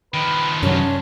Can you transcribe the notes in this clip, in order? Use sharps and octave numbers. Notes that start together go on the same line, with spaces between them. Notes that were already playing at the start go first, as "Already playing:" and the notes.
D#3 F3 B4
F#2 C3 F#3 C#4 D4